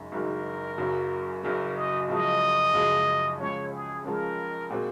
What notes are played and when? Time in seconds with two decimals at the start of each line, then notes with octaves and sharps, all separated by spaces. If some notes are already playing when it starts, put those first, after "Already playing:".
Already playing: F#1 F#2 D#3 G#3
0.12 F#1 F#2 D#3 G#3 A#4
0.77 F#1 F#2 C#3 F#3
1.43 F#1 F#2 C#3 F#3 A#4
1.75 D#5
2.08 F#1 F#2 C#3 F3 G#3 D#5
2.73 F#1 F#2 C#3 F3 G#3
3.38 C#2 C#3 F3 G#3 C#4 C#5
3.72 G#4
4.04 C#2 C#3 F3 G#3 C#4 A#4
4.70 A#2 G#3 C4 F#4